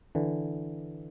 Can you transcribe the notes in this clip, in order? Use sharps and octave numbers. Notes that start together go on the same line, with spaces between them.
D3 E3